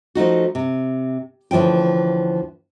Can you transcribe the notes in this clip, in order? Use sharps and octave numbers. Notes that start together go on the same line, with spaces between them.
F3 A3 D#4 F#4
C3
D2 E3 F3 C#4 G5